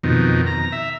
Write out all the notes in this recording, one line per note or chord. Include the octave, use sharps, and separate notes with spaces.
F2 B2 D#3
A#5
E5